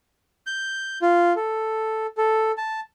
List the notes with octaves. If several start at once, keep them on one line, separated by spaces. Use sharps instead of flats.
G6
F4
A4
A4
A5